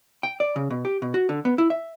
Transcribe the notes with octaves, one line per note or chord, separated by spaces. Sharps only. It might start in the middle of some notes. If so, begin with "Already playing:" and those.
G5
D5
C#3
B2
G4
B2
F#4
D3
B3
E4
E5